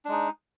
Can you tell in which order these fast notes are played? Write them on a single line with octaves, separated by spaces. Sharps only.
D4 G#3 D#4